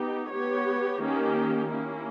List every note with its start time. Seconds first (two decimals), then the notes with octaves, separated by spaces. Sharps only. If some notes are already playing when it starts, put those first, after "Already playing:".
Already playing: B3 D#4 G4
0.32 B3 G4 C#5
1.02 D#3 A#3 C#4 G4
1.72 A#3 C#4 E4